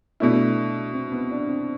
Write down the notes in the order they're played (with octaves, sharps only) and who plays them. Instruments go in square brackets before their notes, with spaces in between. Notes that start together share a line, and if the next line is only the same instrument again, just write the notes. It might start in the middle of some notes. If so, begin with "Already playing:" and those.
[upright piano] B2 A3 E4 [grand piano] D4
[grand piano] C4
B3
D4
C4